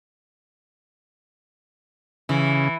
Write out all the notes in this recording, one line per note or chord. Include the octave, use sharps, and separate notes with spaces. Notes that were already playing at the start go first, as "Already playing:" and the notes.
C#3 E3